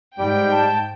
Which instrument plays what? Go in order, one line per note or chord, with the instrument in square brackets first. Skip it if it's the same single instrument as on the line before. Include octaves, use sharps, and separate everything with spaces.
[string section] G#2 G5 G6 [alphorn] G3
[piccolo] A5